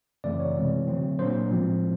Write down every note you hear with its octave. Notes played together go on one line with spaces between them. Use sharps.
F#2 C#3 E3 A3 C4 D5
C#5
C3 E3 G#3 C4
D3 F#3 A3 C4
A#2 F#3 A#3 D4 C5
A2 F3 G#3 C4